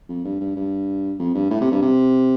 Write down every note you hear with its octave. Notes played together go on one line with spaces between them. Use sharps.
F2
G2
G2
G2
F2
G2
A2
C3
G2
C3